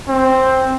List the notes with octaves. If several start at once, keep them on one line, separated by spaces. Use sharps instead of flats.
C4